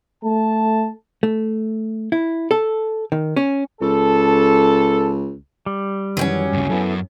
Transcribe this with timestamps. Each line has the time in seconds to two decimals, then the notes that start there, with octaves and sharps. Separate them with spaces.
0.24 A3 A5
1.23 A3
2.12 E4
2.51 A4
3.12 D#3
3.36 C#4
3.81 C#2 A4
5.66 G3
6.17 F#2 D#3 E3 F#3 C4 C#4
6.53 D2 G2 C#3
6.70 F#2 B3 E4 A4